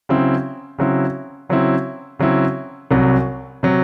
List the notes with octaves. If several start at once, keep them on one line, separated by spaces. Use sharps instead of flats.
C#3 F#3 C4 E4
C#3 F#3 C4 E4
C#3 F#3 C4 E4
C#3 F#3 C4 E4
C2 C3 F#3
C3 F#3